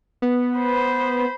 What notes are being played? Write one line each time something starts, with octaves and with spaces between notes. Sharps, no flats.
B3
C5 B5